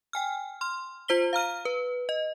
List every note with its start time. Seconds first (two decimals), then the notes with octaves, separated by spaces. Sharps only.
0.13 G5 G#5 F6
0.61 C6 F6
1.08 F4 C5 B6 G7
1.33 F5 A#5 F6 D#7
1.65 B4
2.09 D#5